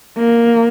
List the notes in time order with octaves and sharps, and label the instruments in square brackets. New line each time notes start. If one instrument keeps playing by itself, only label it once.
[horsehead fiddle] A#3